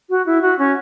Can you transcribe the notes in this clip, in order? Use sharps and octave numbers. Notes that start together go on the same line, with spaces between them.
F#4
E4
F#4
C#4